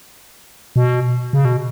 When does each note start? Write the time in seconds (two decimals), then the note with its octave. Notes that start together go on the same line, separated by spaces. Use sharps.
0.76 B2
1.33 C#3
1.45 B2